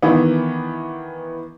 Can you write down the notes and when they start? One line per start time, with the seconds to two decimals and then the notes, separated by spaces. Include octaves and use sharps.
0.02 D#3 E3 B3